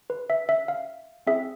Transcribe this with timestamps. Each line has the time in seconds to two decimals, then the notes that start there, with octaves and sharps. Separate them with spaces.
0.10 B4
0.30 E5
0.49 E5
0.68 F5
1.27 C4 E4 G#4 E5